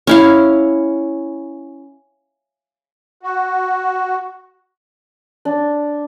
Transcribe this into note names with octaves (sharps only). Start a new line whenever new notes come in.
C#4 E4 F5
F#4
D4